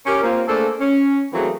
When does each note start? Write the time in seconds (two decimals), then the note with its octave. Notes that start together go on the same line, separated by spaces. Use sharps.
0.06 C#4 G4 A#4
0.23 A#3 C4 F4
0.48 A3 A#3 D4 G#4 A4 C5
0.80 C#4
1.33 E3 F#3 A3 A#3 C4 G#4